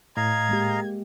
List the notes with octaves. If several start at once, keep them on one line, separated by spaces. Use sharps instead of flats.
A2 D#5 F5 A#5 G#6
G#3 A#3 G4